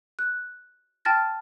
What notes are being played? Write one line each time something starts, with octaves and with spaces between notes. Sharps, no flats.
F#6
G5 A5 F6 A6 A#6